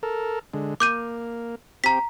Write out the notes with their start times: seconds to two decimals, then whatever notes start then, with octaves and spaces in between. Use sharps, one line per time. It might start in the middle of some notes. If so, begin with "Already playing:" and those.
0.03 A4 A#4
0.54 D3 G#3
0.80 A#3 D6 G6 D#7
1.84 C4 G4 A#5 B6